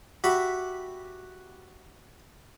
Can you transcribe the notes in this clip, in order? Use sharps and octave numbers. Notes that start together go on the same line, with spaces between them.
F#4 G4 E5 F#5 B5